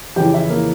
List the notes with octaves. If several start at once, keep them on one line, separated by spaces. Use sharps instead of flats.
F2 C#3 E3 G4 G5
E4 E5
A#3 A#4